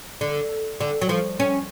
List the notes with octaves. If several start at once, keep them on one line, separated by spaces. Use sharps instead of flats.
D3
D3
F#3
F3
C#4